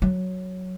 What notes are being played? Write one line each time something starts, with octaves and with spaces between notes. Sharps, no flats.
F#3